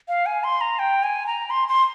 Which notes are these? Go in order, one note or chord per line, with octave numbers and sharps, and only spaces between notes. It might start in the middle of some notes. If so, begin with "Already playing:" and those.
F5
G#5
C6
A#5
G5
G#5
A#5
C6
C6